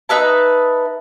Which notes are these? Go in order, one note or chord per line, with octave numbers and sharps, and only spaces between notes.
D#4 B4 E5 A5